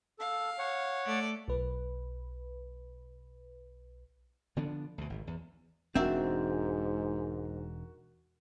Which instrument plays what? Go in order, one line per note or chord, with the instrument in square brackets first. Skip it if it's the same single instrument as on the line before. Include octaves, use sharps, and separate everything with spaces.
[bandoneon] A4 [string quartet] F5
[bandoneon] C#5 F#5
[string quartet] A3 A4 D5
[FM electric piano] B1 B4
[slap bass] D3 F3 B3 D4
D2 B2
G#1
E2
[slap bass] E1 D4 [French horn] G#2 [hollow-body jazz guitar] C4 E5 [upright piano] F#4 A#4